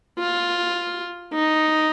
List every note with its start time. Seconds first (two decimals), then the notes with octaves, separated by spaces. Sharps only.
0.19 F4
1.33 D#4